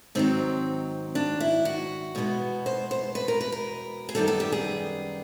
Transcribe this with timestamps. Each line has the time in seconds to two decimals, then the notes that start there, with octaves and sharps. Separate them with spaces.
0.15 G#2 D#3 F#3 C4
1.15 D4
1.40 E4
1.65 F#4
2.15 E2 B2 G#3 B3
2.66 C5
2.91 C5
3.15 B4
3.28 A#4
3.41 B4
3.52 A#4
4.09 G#4
4.15 F#2 D#3 G3 B3 A4
4.28 A4
4.40 G4
4.52 G#4